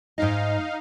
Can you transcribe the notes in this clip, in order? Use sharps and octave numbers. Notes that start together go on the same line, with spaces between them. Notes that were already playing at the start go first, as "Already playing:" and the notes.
G#2 D#4 D#5 F5